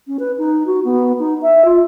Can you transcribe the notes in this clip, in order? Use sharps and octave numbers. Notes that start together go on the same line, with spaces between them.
C#4
B4
D#4
F#4
B3
D#4
E5
F4